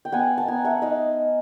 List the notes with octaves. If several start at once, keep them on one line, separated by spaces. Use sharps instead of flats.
G5
B3 F#5 G#5
A5
B3 G#5 A#5
E5 F#5
D#4 D#5 F5